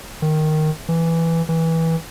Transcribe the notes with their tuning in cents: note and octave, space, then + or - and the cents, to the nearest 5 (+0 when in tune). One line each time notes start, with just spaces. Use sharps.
D#3 -5
E3 +5
E3 -15